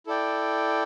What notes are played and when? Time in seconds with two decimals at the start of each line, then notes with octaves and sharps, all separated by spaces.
0.07 E4 A4 D5 G5